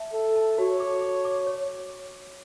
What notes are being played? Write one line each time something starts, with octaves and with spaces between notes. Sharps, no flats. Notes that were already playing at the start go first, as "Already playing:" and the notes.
Already playing: E5 A5
A4 E5
A5
F#4 C#5
D6
D6
D6
C#5